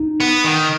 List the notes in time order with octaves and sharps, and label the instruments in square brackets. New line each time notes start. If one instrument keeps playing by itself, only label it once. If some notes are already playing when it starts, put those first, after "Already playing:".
Already playing: [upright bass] D#4
[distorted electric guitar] B3
D#3